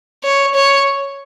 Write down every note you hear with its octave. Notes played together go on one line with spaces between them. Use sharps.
C#5
C#5